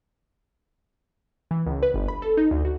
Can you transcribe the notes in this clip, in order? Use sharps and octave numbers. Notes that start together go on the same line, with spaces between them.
E3
C#2
B4
G1
B5
A4
D#4
D2
F#4